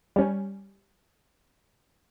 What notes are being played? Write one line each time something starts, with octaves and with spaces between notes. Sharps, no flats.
G3 C#4